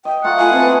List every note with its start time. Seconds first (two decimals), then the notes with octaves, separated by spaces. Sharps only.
0.05 D#5 G5
0.24 A3 F4 F#5 A#5
0.39 A3 E4 F4 G#5
0.53 B3 C4 A5